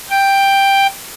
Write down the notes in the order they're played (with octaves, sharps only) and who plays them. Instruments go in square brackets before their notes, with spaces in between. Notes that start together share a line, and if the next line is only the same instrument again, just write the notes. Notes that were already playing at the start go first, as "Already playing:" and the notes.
[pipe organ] G5